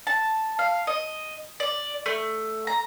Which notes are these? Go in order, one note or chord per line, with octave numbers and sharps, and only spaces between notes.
A5
F5
D#5
D5
A3
A#5